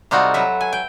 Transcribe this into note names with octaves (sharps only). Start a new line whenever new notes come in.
C3 G3 D#4 F4 F#4 A4
F#3 B4 E5
G#5
G5